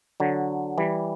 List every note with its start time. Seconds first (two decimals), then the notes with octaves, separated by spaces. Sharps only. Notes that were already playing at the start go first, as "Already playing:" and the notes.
0.20 D3 F#3
0.78 E3 G3